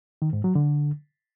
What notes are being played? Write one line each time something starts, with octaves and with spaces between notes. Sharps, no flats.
D#3
G#2
F#3
D3